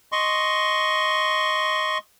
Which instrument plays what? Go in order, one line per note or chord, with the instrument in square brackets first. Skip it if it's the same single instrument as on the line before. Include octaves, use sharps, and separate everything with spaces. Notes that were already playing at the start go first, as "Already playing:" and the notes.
[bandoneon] D#5 C6 C#6